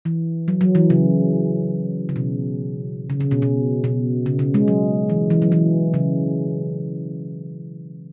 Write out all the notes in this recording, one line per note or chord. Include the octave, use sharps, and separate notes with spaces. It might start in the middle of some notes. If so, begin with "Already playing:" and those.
E3
F#3
F#3
E3
C#3
C#3
B2
C#3
C#3
B2
B2
B2
C#3
C#3
G#3
F#3
E3
E3
F#3
E3
C#3